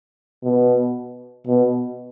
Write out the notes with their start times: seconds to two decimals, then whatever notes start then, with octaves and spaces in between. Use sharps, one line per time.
0.43 B2
1.47 B2